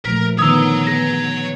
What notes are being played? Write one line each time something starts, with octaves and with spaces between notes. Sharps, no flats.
A#2 F3 A3 A#4 B6
D3 D#3 B3 C#5 A#5 D#6 E6
B3 G#4 A#6